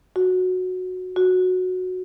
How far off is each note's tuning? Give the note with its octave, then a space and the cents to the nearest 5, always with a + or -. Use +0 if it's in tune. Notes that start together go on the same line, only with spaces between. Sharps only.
F#4 -10
F#4 -10